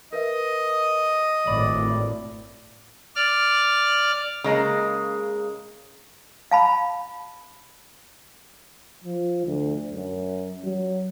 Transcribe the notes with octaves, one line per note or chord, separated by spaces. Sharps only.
A#4 B4 D#5 E5
G#1 A2 D5 B5 F#7
D5 F6
C#3 G#3 A#3
F5 A5 B5
F3
D2
F#2
F#3